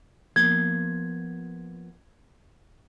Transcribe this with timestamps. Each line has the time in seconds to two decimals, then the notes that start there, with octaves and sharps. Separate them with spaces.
0.36 F3 A#3 B3 G#6